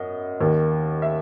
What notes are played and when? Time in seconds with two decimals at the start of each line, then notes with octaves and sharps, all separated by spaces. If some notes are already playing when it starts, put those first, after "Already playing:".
Already playing: F#2 D#5 F#5
0.40 D#2 D#3
1.02 E5